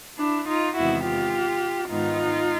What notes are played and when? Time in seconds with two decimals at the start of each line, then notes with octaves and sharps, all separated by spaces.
0.19 D4 E4
0.48 D#4 F4
0.76 E2 C3 D#3 G#3 B3 E4 F#4
1.04 F4 G4
1.89 G#2 D#3 G#3 B3 D#4 F4